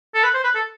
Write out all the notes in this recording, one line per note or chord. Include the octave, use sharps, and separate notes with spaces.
A4
B4
C5
B4
A4